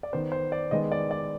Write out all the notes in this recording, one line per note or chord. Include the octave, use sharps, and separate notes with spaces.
D5
D#3 B3 C5
C5
D5
D#3 G#3 B3 D#5
D5
D5